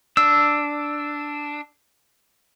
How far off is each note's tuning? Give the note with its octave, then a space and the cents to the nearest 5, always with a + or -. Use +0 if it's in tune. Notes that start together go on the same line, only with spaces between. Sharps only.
D4 +0 E6 +0